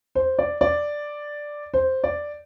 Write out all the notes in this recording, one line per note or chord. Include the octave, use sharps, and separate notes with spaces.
C5
D5
D5
C5
D5